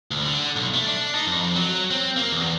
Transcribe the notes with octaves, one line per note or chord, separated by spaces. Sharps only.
D2
D3
B1
A3
D4
D#4
F2
F#3
C4
A#3
E2